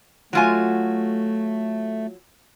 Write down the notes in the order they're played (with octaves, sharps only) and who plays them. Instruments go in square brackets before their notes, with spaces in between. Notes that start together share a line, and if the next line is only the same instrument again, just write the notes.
[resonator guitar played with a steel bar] F#3 F4 G#5 [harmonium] A3